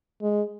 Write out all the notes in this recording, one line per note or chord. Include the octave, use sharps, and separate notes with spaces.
G#3